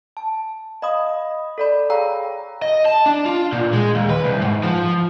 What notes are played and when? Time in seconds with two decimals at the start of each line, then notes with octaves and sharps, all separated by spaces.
0.17 A5
0.82 D#5 F5 B5 D#6
1.58 A4 D5 B5
1.90 G#4 C#5 F5 G5 A#5 E6
2.62 D#5
2.86 A5
3.06 D4
3.25 F4
3.52 A#2
3.73 G#3
3.95 D#2
4.10 B4
4.24 C2
4.42 G#2
4.63 F3